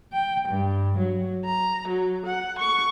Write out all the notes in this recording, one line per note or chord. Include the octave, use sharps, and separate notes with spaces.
G5
G2
F#3
A#5
F#3
F#5
C#6